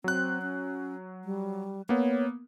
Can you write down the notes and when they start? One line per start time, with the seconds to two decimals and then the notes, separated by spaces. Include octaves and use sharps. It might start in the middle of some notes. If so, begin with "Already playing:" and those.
0.04 F#3 C4 F#6
0.42 C#4
1.24 G3
1.89 A#3 B3 C#5